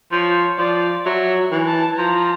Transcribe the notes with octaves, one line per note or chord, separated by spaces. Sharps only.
F3 C#5
F3 D5
F#3 E5
E3
A5
F3 A#5